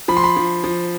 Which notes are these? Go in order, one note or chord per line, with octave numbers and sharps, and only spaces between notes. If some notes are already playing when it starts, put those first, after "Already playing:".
F3 B5
C6
B5
F3
F3